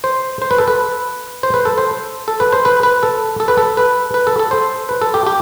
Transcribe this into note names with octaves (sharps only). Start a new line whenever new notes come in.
C5
C5
B4
A4
B4
C5
B4
A4
C5
A4
B4
C5
B4
B4
A4
A4
B4
A4
B4
B4
A4
A4
C5
B4
A4
G4
G4